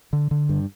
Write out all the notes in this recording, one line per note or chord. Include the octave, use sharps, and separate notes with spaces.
D3
D3
G2